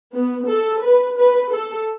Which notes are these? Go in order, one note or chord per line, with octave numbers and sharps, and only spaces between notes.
B3
A4
B4
B4
A4